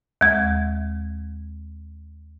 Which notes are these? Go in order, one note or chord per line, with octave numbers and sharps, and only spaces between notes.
D#2 G#3